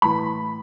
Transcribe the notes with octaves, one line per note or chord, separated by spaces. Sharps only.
A2 E3 B5